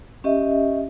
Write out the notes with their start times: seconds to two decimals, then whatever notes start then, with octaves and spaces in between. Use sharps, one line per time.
0.24 C#4 G4 D#5 E5